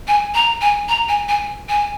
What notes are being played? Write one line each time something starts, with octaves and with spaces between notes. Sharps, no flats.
G#5
A#5
G#5
A#5
G#5
G#5
G#5